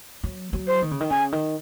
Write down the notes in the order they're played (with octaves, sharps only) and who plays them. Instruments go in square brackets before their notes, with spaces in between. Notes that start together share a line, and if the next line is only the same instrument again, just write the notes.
[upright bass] F#3
F#3
[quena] C5
[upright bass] D#3
C#3
D#3
[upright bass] C#3 [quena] G#5
[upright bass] D#3